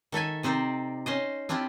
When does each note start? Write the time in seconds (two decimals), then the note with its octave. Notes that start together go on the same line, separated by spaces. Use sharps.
0.12 D#3 A4 E5 G#5
0.43 C3 C4 D#4 C5 D5
1.06 C#4 C5 D#5
1.49 C4 D4 E4 F4 G4